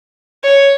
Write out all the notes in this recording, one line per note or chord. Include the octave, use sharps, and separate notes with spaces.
C#5